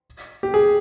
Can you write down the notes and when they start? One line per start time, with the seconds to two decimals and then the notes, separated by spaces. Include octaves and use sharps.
0.43 G4
0.54 G#4